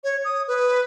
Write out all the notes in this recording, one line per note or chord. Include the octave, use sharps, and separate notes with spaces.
C#5
D#6
B4